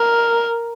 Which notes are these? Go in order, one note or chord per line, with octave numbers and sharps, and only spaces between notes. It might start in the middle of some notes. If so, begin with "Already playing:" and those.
Already playing: A#4